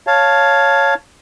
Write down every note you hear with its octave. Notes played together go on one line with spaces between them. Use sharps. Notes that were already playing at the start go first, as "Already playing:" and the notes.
C#5 F5 A5